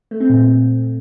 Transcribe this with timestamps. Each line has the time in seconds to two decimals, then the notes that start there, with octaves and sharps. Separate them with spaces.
0.11 A3
0.20 C4
0.30 A#2